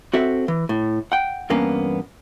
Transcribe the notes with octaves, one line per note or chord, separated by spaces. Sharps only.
C4 F#4 A4 E5
E3
A2
F#5 G5
E2 G2 A#3 B3 C#4